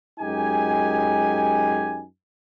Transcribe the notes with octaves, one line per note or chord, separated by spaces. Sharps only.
F#2 G#3 D#4 G4 G#5